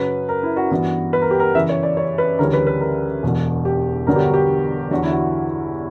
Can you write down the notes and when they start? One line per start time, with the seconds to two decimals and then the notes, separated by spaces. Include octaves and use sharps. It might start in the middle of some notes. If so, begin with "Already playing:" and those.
Already playing: F#2 C#3 F#3 C#4 B4
0.29 A#4
0.43 E4
0.56 F#4
0.71 G2 E3 B3 F#4
1.13 B4
1.22 A#4
1.31 G4
1.40 A#4
1.55 F#2 C#3 E3 E5
1.69 C#5
1.83 D5
1.97 C#5
2.18 B4
2.39 D2 C#3 E3 G3 C#4 A#4
2.53 B4
2.67 B4
2.81 A#4
3.23 E1 E2 B2
3.65 G4
4.07 G1 G2 D3 F#3 B3 A#4
4.16 G4
4.25 F#4
4.34 G4
4.91 E2 D3 F#3 F#4
5.03 E4
5.12 F#4